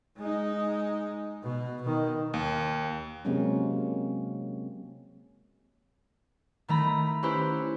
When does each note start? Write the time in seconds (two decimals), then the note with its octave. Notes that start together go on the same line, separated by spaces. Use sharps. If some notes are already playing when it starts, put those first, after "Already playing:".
0.17 G#3 D#4
1.43 B2
1.82 B2 D#3
2.34 D#2
3.25 C3 F#3 G#3 A#3 C4 C#4
6.68 D#3 A3 A#5 B5
7.23 C#4 E4 G4 B4 C5